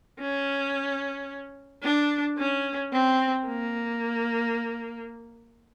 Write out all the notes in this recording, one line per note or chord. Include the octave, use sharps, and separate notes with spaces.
C#4
D4
C#4
C4
A#3